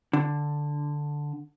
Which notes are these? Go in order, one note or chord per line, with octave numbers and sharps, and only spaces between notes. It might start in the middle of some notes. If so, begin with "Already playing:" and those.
D3